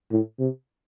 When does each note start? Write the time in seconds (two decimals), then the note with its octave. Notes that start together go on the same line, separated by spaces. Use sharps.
0.11 A2
0.39 C3